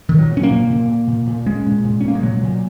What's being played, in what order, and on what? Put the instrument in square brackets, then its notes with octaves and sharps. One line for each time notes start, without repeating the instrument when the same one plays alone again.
[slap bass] A#2 [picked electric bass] D#3
[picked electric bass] F#3
[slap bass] A#2
[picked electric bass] C#4
A#3
[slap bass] A#2
A#2
A#2
A#2
A#2
[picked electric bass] G#3 [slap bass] C#4
[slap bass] A#2
A#2
[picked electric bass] C#4
[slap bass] A#2 [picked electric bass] A#3
[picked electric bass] G#3
[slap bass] A#2 [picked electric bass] F#3
[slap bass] A#2